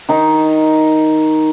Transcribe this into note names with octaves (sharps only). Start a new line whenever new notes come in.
D#3 D#4